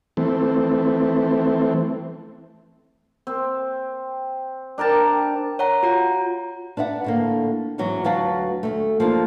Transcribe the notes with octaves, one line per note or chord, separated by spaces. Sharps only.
E3 A3 C4
C4
D4 A#4 G5 A5
C#5 F#5 A#5
F4 F#4 A#5
D4 B4 E5 F#5
A2 D3 A#3
E2 G#2 E3 F#3 C#4
D2 F#3 B4 F5 F#5 A5
D2 G#2 A3
F3 A#3 D4 D#4